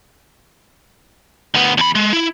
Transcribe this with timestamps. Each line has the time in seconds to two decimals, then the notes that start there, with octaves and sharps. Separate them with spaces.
1.54 D2 B3
1.78 E2 B5
1.95 G#3
2.13 E4